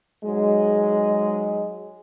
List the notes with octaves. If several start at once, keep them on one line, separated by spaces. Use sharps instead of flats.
G#2 F#3 G#3